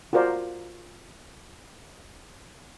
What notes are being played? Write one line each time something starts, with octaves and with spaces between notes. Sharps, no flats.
F4 F#4 A#4 C5 D5